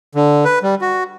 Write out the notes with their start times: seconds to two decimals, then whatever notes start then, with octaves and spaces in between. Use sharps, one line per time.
0.15 D3
0.45 B4
0.63 G3
0.82 F#4